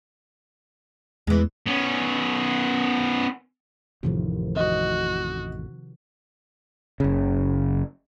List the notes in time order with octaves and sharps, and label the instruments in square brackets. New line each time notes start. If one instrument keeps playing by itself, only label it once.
[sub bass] E2 [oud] E3 G#3
[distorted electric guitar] B3 C#4
[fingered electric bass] A1 F2 A2 [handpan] C3 D#3 F3
[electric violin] F#4 [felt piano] D#5
[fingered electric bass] F#1 C#3